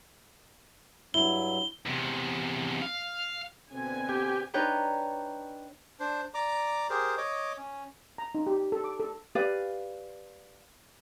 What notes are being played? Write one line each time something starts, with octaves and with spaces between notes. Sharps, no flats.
G2 F#3 E4 G7
E2 C3
F5
B2 D3 C4 B4 G#5
G4
D4 D#4 B4 C#5 G5 A#5
D4 C5
D5 A#5 D6
G4 G#4 A#4 C5
C#5 D#5 D6
C#4
A#5
D#4
G4
A4
D6
A4
G4 B4 D5 F5